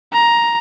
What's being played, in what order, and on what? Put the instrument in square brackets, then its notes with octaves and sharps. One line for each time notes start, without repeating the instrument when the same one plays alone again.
[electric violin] A#5